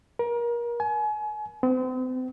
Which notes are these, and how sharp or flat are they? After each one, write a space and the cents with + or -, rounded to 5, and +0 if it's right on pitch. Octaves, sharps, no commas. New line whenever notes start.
A#4 +30
G#5 +35
C4 -40